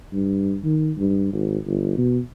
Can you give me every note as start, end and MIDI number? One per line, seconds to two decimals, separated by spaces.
0.13 0.57 43
0.64 0.92 51
0.98 1.31 43
1.33 1.58 32
1.66 1.94 31
1.98 2.19 47